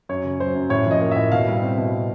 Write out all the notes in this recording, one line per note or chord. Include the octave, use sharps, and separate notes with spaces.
F#2 C#5
C#3
F#3 C5
F#2
A2 C#5
F3 D#5
A#3
A2 E5
B2 F5
G3
C4
B2